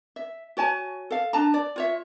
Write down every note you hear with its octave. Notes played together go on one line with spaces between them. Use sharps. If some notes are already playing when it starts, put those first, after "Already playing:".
E5
F#4 C#5 G#5 A5
A4 F5
D4 A5 A#5
D5
F4 C#5 E5